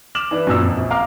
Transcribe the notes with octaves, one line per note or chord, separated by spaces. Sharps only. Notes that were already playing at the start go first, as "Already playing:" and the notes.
D6 F6 E7 F#7
E3 D4 B4
F#2 A#2 E6
F2
A#1
F5 A#5 D6 F6